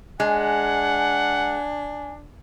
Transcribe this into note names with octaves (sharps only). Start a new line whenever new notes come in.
G#3 D4 F#5 G#5